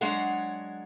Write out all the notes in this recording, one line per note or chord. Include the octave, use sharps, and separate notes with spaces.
F#3 G#3 D4 C#5 F#5